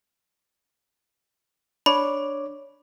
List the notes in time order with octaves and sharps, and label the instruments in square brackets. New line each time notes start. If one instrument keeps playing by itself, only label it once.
[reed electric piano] D4 C#5 D6 [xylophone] B5